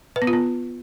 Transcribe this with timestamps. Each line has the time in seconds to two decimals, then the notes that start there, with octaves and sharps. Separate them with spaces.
0.16 B4
0.22 B3
0.27 F4
0.33 B3